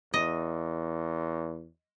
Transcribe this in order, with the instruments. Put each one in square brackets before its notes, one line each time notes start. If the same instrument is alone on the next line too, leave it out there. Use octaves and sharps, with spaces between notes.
[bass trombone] E2 [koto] D#5